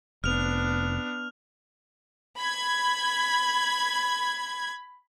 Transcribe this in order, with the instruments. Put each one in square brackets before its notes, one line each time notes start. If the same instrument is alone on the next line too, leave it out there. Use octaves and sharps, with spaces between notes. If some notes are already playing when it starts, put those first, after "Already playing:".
[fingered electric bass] F1 [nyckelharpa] B3 D4 [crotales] F6 F7
[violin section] B5 G#6